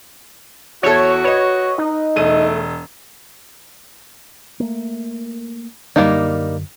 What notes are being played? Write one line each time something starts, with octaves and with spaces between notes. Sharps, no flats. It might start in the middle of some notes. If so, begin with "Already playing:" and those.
E2 E4 F#4 A4 C#5
B4 C#5 D#5
D#4
E1 A3 D#7
A3 A#3
F#2 D3 G3 A#3 D#4